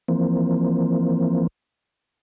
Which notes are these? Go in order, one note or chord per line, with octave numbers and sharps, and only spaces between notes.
E3 F3 A#3 C4